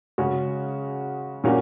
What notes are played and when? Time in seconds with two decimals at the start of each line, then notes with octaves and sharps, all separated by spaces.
0.18 C#3 G#3 C#4 F#4
1.44 A#2 A#3 C#4 F#4